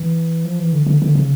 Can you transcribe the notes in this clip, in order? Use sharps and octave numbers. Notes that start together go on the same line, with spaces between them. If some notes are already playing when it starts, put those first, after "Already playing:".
Already playing: E3
F3
E3
D3
D3
D3
C#3